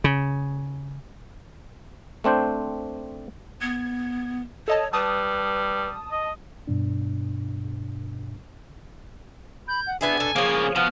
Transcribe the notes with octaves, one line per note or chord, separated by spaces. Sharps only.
C#3
A3 C4 D4 C5 G5
B3 G#6
A4 C#5 D#5 A5
G3 B4 A5 D#6
D#5
G2 B2 D4
B5 G6
F#5
B3 D4 E4 G#4 G#5
B2 A4
C#3 F3 A#3 G#4 C#5
B2 F3 B3 F#5 F6